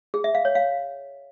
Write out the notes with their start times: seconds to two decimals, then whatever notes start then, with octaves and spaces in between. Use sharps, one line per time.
0.14 G#4
0.24 E5
0.35 F5
0.45 C#5
0.55 F5